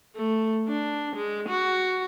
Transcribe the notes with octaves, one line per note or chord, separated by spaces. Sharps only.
A3
D4
G#3
F#4